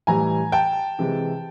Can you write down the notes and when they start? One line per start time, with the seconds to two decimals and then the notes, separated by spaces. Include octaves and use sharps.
0.07 A2 E3 G3 G#5 A#5
0.52 G5 A5
0.99 C3 E3 G#3